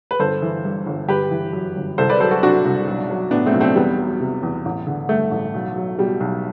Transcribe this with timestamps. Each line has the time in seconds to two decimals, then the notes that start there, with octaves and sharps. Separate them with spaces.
0.11 B4
0.19 G1 A4 C5
0.42 E3
0.65 G2
0.86 G1
1.09 G1 G4 B4
1.31 E3
1.53 F#2
1.76 G1
1.98 C2 A4 C5
2.09 B4 D5
2.20 F#3 A4 C5
2.31 F#4 A4
2.42 C3 D4 F#4
2.65 C2
2.87 B1
3.10 F#3
3.31 A2 B3 D4
3.46 A3 C4
3.54 B1
3.60 A3 C4
3.76 E2 G3 B3
3.99 F#3
4.20 C3
4.43 E2
4.65 A1
4.87 D3
5.09 G2 A3
5.31 A1
5.54 B1
5.76 F#3
5.98 B2 G3
6.20 B1